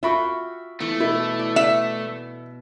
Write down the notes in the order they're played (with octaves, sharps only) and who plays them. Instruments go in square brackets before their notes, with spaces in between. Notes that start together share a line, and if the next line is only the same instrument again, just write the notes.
[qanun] F4 F#4 G5 [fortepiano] E5 B5 C#6
[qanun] E3 B3 D6 [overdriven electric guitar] A3
[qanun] B2 [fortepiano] E4
[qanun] D5
[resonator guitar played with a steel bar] E5